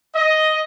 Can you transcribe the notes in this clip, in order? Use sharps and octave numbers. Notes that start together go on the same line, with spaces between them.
D#5